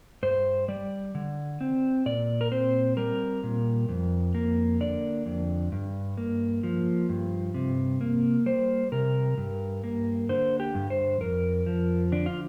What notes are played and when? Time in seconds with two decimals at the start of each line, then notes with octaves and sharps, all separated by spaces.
0.23 G2 C5
0.68 G3 D5
1.15 D3
1.61 C4
2.06 A#2 D5
2.41 A#4
2.52 C4 C5
2.97 G3 A#4
3.43 A#2
3.89 F2
4.35 A#3
4.80 D3 D5
5.26 F2
5.72 G2
6.17 A#3
6.63 F3
7.09 G2
7.54 C3
8.01 A#3
8.46 G3 C5
8.92 C3 A#4
9.38 G2
9.84 A#3
10.29 D3 C5
10.60 G4
10.75 G2
10.90 C5
11.21 F2 A#4
11.66 F3
12.12 D3 D4
12.26 F4